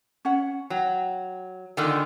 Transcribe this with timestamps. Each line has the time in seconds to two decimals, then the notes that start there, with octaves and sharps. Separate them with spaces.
0.25 C#4 C#5 F#5
0.70 F#3 G5
1.77 A#2 D3 D#3